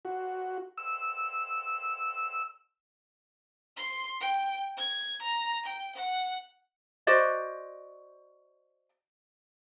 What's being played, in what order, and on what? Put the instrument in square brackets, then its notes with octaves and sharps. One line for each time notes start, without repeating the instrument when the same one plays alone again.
[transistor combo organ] F#4
E6
[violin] C6
G5
G#6
A#5
G5
F#5
[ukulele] F#4 C5 D5 D#5